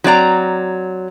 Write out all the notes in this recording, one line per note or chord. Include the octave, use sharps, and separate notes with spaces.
F#3 C4 D5 A#5